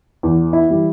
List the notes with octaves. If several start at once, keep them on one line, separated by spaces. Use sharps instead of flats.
E2
E4
E3 G3